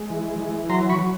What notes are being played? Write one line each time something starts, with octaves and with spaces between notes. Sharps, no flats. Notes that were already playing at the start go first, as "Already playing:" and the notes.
Already playing: G#3
E3
E3
F#3 A#5 C6
B5 C#6
F#3